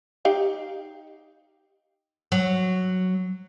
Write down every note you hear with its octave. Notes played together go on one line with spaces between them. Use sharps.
D#4 G4 F5
F#3